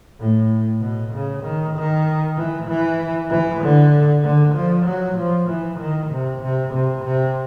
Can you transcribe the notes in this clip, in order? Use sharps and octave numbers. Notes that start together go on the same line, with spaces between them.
A2
B2
C#3
D#3
D#3
E3
E3
E3
D3
D3
F3
F#3
F3
E3
D#3
C3
C3
C3
C3